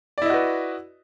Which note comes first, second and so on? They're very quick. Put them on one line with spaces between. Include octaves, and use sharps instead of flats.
D5 E4 D#5 F#4 B4